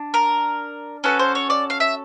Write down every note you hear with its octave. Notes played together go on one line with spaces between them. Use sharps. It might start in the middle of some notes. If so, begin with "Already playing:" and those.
Already playing: D4
A#4
C#4 F#4 A4 B4
C5
C#5
D5
F5
E5